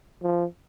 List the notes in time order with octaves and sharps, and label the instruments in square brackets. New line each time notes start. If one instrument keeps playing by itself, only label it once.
[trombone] F3